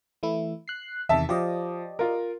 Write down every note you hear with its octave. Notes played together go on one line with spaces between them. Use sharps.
E3 A3 E4
F#6 C7
E2 C3 D#3 E5 A5
F3 G4 D5 D#5
F4 A#4